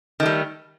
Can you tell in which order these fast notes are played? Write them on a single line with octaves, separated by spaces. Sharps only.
D#3 A3 G3